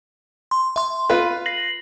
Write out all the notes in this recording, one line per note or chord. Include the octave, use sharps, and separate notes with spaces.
C6
E5 C6
F4 B4
A#6 C7 F#7